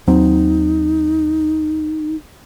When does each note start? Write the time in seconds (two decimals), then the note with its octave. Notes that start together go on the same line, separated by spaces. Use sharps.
0.07 D#2 F#3 C4 D#4